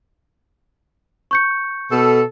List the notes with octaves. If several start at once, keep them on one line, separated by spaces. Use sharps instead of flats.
C#6 G6 C#7
B2 A4